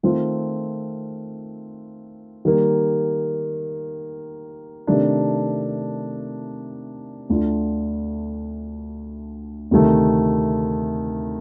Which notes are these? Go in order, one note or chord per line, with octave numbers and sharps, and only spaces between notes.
D#3 A3 C4 F4
D#3 G3 A#3
C3 D#3 A3 D4
D2 D3 A3 D4 F4
D2 C3 D#3 A3